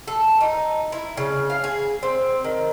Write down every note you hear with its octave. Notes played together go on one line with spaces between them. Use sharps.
A4
D#4
E4
C#3
F5
G#4
C4
D#3